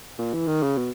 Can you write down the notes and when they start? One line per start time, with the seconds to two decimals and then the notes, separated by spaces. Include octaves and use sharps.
0.18 A#2
0.34 E3
0.48 D#3
0.63 C#3
0.77 B2